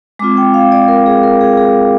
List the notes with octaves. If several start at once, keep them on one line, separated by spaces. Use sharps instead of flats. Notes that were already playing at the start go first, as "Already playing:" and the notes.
G#3 C4 F4 D6
G5
F5
D5
A#4
G#4
A#4
G#4
G#4